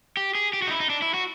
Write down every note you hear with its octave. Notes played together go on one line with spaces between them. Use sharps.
G4
G#4
G4
F#4
D#4
E4
D#4
D4
E4
F#4